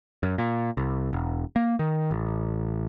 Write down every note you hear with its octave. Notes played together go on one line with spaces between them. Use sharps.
F#2
A#2
C2
E1
A#3
D#3
A1